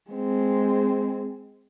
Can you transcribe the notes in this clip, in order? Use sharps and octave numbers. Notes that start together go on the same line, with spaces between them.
G#3 C4